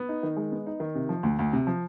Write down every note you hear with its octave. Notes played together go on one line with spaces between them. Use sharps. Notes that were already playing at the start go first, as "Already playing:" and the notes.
Already playing: B3
D#4
D#3
G#3
B3
D#4
D#3
C3
F3
D2
D2
C3
F3